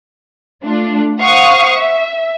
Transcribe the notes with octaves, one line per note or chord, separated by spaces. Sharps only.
A3 D4 F4
C5 F5 F#5 C#6 D#6
E5